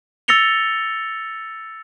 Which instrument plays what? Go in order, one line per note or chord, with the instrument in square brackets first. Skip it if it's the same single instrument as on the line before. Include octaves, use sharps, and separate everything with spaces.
[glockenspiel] E6 A6 A#6 C#7 F7 G7